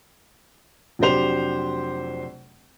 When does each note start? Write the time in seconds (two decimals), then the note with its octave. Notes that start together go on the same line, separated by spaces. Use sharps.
0.99 F1 F#3 D4 G4 C5 F7